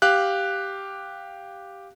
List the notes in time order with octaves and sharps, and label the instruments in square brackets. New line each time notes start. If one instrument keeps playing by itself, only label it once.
[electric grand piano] G4 F5 F#6